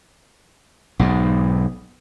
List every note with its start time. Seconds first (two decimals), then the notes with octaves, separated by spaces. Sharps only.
0.99 B1 G#2